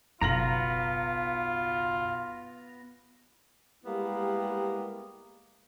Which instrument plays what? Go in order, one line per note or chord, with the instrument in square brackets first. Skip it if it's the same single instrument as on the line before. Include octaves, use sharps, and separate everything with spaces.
[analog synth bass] F#1 [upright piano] B1 A#6 F#7 [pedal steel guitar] B3 A#5 [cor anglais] F4
[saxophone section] G3 G#3 A#3 B3 E4 G4